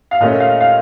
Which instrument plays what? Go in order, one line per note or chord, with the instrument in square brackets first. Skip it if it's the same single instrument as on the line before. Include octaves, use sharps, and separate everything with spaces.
[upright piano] F5
A#2 A3 C#4 F4 D#5
F5
F5